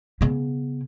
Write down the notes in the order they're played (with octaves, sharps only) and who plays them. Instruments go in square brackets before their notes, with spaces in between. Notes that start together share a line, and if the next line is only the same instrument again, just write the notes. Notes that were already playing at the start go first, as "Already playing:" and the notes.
[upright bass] C#3 B3